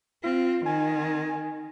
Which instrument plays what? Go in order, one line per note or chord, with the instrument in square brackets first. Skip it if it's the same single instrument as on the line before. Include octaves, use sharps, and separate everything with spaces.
[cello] C4 [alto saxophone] F4
[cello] D#3 [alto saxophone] G#5